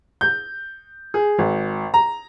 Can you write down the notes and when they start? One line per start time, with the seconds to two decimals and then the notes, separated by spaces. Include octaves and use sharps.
0.21 G6
1.14 G#4
1.38 G#1
1.94 A#5